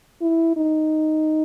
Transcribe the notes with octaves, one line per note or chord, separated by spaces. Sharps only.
E4
D#4